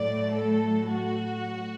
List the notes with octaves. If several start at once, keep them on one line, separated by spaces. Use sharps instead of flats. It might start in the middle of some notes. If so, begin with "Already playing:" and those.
Already playing: A2 F#3 A3 D5
A4
F#4